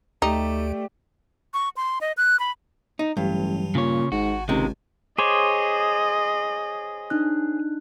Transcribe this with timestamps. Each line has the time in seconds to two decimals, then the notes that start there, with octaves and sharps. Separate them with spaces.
0.22 D2 A3 D#4 G4 D5
1.54 C#6
1.77 C6
2.01 D#5
2.17 F#6
2.39 B5
2.99 D#4
3.17 A1 G2 E3 F#3
3.75 A#2 C#3 C#5
4.12 G#1 G#2 F#4
4.49 C#2 C3 D#3 G#3
5.18 G#4 C5 C#5 D#5 D6
7.10 D4 D#4 F#6